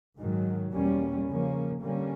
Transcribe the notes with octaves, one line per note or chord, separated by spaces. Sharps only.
G#2 D#3 F#3
E2 B2 G3 A#3 C#4
C#3 F3 A#3 C#4
D3 G3 A#3 C#4